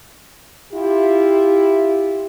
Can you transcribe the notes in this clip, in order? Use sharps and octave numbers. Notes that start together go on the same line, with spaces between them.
E4 F4 G4